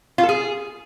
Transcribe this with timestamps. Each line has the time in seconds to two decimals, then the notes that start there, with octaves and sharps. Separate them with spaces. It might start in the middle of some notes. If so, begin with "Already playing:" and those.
0.18 F4
0.23 A4
0.29 G#4